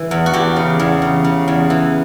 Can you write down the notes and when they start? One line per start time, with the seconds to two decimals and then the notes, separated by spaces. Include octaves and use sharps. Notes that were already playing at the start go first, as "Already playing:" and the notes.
Already playing: E3
0.11 E2
0.26 F#4
0.33 E2 G4
0.56 C#3
0.80 E2
1.02 C#3
1.24 C#3
1.48 E2
1.70 E3